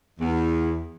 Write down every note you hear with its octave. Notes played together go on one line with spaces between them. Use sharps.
E2